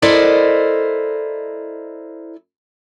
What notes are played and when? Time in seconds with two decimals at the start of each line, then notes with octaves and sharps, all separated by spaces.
0.02 E4 A4 A#4 C5 D5 D#5